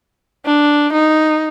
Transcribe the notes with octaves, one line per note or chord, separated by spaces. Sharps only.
D4
D#4